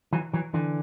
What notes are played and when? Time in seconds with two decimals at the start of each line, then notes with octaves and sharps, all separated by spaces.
0.13 E3 F#3
0.33 E3 F#3
0.54 D3 E3